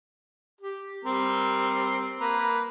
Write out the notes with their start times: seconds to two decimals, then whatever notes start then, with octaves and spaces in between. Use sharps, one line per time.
0.61 G4
1.05 G3 C4 A#4
2.20 A#3 B4 A#5